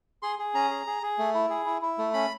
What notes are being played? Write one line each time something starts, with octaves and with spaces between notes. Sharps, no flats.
G#4 C6
G#4
C#4 A#5
G#4
G#4
G#4
A3
E4
G#4
E4
E4
A3
C#4 B5